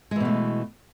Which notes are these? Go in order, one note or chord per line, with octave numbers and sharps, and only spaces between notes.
B2 E3 G#3 A3